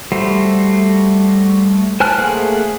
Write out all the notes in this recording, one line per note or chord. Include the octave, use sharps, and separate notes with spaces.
G3 A3 F#4 C5
C5 G#5 A5 F6 F#6
A3 A#3 G#4 C5 F#5